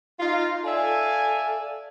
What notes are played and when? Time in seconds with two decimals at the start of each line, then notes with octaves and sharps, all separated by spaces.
0.20 D#4 F4
0.65 A4 D5 E5 F5 G#5